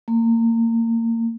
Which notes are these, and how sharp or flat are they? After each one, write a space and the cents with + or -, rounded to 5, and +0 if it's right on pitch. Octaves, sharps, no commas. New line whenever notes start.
A#3 -30